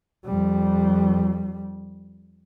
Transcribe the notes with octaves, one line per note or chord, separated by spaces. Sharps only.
F2 G3